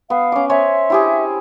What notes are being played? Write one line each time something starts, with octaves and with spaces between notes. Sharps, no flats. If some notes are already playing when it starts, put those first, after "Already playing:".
B3 F5
C#4 D6
C5 C#5 E5 G#5
E4 G4 G#4